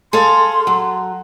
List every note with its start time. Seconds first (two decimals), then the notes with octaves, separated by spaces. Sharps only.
0.13 G#4 A4 F5 C6
0.67 F#3